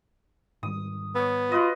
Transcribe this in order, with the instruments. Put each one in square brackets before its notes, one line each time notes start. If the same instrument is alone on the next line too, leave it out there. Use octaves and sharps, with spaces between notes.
[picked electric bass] G#2 D#3 G3 [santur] D#6
[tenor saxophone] B3 [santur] C#5 E6
[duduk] F4 [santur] F#4 B4 D#5